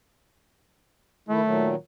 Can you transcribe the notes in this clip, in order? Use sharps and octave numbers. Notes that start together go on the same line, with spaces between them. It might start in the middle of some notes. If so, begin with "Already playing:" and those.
D#3 A3 E4
A#2 D#3 F#3